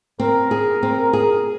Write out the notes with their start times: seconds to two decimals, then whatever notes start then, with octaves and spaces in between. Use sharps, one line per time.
0.20 C4 A#4
0.51 G#4
0.83 C4
1.13 G#4